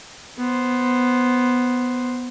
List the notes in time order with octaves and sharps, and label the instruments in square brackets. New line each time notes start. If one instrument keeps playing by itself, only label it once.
[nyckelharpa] B3 C5